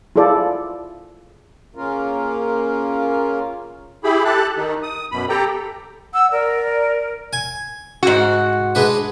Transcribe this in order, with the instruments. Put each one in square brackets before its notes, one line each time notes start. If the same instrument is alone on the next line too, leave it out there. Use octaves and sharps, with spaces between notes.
[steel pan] E4 F4 G#4 A4 D5
[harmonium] C#3 A#3 C#4 F4 A#4
[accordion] E4 G4 G#4 B5
G4 A4 A5 F#6
D#3 D#4
D#6
F#2 B2 B5
G4 A4 G5 A#5
[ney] F#5 [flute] E6
[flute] A#4 [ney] D5
[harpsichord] G#5
[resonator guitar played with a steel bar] G#2 F#4
[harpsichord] G#3 D4 B4